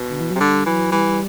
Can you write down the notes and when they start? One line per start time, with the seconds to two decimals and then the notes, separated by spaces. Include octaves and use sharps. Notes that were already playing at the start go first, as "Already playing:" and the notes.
Already playing: B2
0.09 D3
0.20 E3
0.30 C3 F#3
0.40 D3 G3
0.66 E3 F#3
0.92 E3 G3